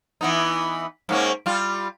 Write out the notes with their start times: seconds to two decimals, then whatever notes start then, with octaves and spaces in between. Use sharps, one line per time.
0.21 E3 B3 D#4
1.09 G#2 A#3 C#4
1.46 G3 F4